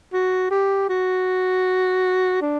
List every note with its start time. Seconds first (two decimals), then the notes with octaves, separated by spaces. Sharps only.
0.13 F#4
0.51 G4
0.89 F#4
2.42 D4